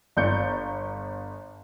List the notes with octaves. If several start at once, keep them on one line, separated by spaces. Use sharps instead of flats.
G1 D5 G6 C#7